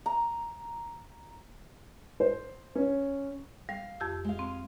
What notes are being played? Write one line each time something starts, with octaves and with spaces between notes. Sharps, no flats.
A#5
C5
C#4
G3 F5
F2 G4 E6
G#3 F5
C4